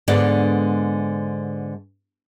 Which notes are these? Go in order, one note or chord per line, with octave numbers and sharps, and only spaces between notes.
G#2 D3 G#3 B3 D4 D5